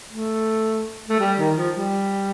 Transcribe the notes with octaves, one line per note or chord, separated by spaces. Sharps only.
A3
A3
G3
D#3
F3
G3